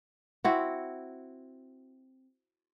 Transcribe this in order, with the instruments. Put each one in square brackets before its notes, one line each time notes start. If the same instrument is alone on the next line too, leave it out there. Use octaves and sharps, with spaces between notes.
[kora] C4 E4 F#4